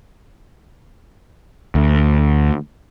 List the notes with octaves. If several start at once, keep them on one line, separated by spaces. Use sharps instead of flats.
D2